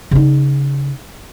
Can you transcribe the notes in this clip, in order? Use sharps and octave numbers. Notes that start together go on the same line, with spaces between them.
C#3 D#4